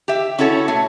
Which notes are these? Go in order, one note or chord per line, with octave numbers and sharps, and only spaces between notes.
G4 E5
C#4 E4 F#4 A4 B4 C#5
B2 A3 C#5